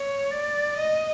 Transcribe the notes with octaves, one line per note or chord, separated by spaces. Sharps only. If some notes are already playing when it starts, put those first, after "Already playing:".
Already playing: C#5
D5
D#5